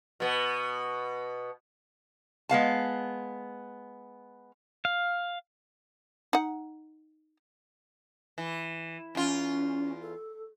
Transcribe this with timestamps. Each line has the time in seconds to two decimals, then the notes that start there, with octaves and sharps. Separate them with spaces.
0.20 B2 B3
2.49 G#3 B3 F5 A5
4.85 F5
6.33 D#4 F#5
8.38 E3
9.15 E2 C#4 F4
10.01 A4